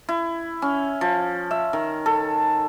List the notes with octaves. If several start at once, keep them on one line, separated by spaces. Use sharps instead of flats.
E4
C#4
F3
E5
D#3
A4